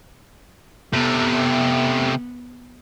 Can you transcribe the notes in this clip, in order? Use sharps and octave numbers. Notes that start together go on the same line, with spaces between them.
C3 A3 B3